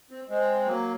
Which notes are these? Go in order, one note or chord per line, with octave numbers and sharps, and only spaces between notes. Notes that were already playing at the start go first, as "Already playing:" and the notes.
C4
G#3 C4
F#3 A#3